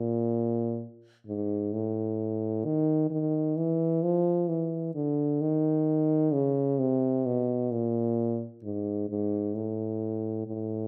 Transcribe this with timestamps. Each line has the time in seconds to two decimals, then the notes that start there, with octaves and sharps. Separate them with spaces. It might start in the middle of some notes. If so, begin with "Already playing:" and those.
Already playing: A#2
1.27 G#2
1.73 A2
2.65 D#3
3.10 D#3
3.57 E3
4.03 F3
4.48 E3
4.95 D3
5.41 D#3
6.33 C#3
6.79 C3
7.25 B2
7.71 A#2
8.63 G#2
9.09 G#2
9.55 A2
10.47 A2